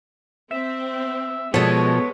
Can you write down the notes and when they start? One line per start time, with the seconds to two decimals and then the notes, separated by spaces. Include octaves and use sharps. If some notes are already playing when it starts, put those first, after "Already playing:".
0.51 C4 E5
1.54 B2 F3 G#3 B3 A4 C#5